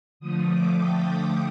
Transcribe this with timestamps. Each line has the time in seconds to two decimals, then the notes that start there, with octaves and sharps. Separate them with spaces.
0.20 D3 F3 A3 D#6
0.48 D6
0.78 G5